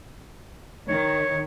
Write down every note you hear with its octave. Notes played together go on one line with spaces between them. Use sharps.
D#3 C#5